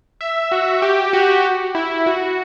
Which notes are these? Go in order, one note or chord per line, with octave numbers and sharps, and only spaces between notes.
E5
F#4
G4
F#4
E4
F#4